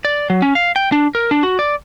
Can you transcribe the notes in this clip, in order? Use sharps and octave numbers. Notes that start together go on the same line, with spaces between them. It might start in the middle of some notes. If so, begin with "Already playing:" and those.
D5
F#3
C#4
F5
G5
D4
A#4
D4
F#4
D5